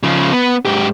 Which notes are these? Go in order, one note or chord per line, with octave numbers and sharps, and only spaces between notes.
C#3 F3
B3
G#2 G4